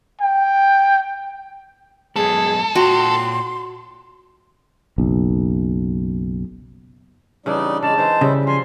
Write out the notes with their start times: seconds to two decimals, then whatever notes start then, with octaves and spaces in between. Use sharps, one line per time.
0.21 G5
2.16 F#2 G#3 B3 G#4 A4
2.75 A#2 F4 F#4 G5 C6
4.98 F#1 B1
7.46 C#3 E3 G3 D4 D#4 D5
7.83 C#3 G#3 D5 A5
7.98 E3 G#3 D#4 C5
8.21 C#3 G3 E4
8.47 F3 G#5 C6